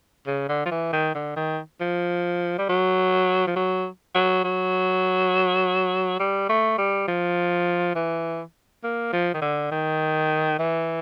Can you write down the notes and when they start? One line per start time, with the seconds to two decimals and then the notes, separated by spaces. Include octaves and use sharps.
0.27 C#3
0.49 D3
0.65 F3
0.71 E3
0.93 D#3
1.15 D3
1.36 D#3
1.81 F3
2.58 G3
2.69 F#3
3.47 F3
3.56 F#3
4.15 F#3
4.44 F#3
6.19 G3
6.49 A3
6.78 G3
7.08 F3
7.95 E3
8.84 A#3
9.13 F3
9.34 D#3
9.42 D3
9.71 D#3
10.59 E3